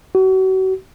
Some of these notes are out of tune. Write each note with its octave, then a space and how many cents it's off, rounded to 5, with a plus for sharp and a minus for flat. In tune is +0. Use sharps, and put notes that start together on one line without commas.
F#4 +35